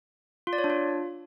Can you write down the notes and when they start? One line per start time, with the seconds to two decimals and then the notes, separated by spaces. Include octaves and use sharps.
0.47 F4
0.53 D5
0.58 C#5
0.64 D4
0.70 F4